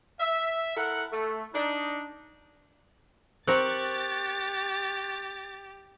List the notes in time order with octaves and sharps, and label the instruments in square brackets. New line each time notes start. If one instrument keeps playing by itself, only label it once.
[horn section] E5
E4 A4 A#4 F#5
A3
D4 D#4
[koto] C4 A#4 [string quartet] G4 [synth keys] C#6 F#6 [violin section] A6